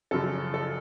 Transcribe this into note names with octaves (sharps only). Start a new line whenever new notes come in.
F#2 C#3 F3 A4
A4